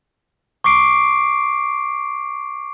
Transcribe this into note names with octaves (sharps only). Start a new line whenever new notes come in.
C#6 D6 C7 D7